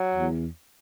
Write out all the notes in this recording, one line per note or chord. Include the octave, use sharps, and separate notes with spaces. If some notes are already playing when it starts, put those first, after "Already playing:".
Already playing: F#3
E2